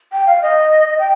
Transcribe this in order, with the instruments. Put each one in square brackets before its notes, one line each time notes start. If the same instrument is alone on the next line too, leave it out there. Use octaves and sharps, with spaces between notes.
[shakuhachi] G5
F5
D#5
G5